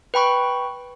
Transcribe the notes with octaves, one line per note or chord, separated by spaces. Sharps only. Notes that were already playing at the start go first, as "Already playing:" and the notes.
B4 G5 B5 C#6